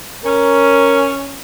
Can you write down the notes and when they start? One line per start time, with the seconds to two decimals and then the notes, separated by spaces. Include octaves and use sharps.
0.25 C#4 A#4